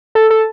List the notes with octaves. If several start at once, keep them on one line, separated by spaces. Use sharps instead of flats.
A4
A4